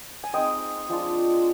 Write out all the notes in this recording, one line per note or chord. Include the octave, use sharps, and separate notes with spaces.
G#5
G#3 C4 D#4 D#5 G5
F3 G#3 D4 F4